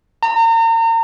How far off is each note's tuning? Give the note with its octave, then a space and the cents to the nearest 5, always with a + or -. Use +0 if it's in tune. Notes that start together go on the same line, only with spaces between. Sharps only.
A#5 -35